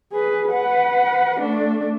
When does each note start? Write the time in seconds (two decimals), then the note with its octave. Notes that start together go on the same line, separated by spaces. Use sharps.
0.12 G#4 B4
0.52 B4 F#5
1.40 A3 D4